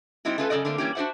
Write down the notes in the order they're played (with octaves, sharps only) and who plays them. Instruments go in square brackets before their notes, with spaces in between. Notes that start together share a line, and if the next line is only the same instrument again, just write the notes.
[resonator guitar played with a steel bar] G3 C4 D#4 E4 F#4
A3 C#4 F4 A4 B4
F#2 C#3 B3 A4 D5 D#5
D3 A3 A#3 C4
E3 G3 A#3 C#4 E4 G4
D4 F#4 G4 C5 E5 F#5